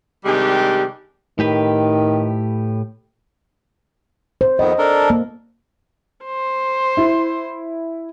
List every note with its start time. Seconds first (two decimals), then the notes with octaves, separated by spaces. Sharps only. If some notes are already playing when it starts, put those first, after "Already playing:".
0.25 C3 D#3 G3 G#3 D4 G4
1.39 A2 D#3 G4 B4
4.41 C5
4.59 F2 D#3 B3 D#5
4.78 D4 A4 A#4
5.10 A#3
6.25 C5
6.97 E4